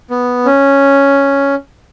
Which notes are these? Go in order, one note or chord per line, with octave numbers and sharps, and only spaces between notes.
B3
C#4